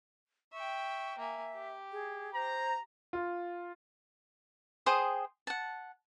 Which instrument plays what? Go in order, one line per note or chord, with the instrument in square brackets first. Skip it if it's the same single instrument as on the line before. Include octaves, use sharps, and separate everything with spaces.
[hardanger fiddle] E5 G5 [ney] C#6
[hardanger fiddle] A#3 G#5 [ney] E5
[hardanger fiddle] G4
[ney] G#4
[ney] C5 [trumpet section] A#5
[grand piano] F4
[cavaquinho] G#4 C5 G5 D#6
F#5 A5